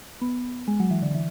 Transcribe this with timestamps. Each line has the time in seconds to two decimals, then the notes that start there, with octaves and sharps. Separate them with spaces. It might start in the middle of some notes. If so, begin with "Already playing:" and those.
0.21 B3
0.68 G#3
0.80 F#3
0.91 E3
1.02 D3
1.14 E3